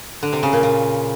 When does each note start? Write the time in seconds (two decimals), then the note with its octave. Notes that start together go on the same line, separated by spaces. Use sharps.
0.23 D3
0.33 C3
0.43 C#3
0.53 A#2
0.63 A#2